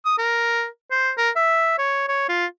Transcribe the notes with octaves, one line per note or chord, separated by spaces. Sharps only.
D#6
A#4
C5
A#4
E5
C#5
C#5
F4